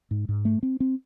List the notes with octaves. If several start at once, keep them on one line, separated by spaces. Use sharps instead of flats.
G#2
G#2
A3
C4
C4